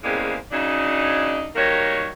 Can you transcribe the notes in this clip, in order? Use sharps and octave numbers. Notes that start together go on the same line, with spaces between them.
E2 C#3 G3 G#3 A#3 C4
C#3 F#3 D4 D#4
D#3 G3 A#3 F#4 C#5